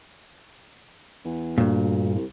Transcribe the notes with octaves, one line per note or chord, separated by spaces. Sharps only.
E2
D2 G2 A#2
C2